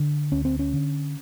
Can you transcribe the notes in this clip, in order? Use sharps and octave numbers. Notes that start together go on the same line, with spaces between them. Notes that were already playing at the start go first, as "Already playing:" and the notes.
Already playing: D3
D2 C#4
C4
C#4
D3